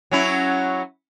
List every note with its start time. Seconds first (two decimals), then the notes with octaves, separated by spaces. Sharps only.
0.11 F#3 C#4 E4